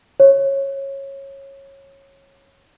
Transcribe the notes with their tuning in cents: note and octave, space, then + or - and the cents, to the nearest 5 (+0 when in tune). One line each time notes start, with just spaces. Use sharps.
C#5 -20